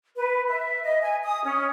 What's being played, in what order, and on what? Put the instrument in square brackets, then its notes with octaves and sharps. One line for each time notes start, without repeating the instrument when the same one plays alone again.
[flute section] B4
E5
D#5
G#5
D#6
C#4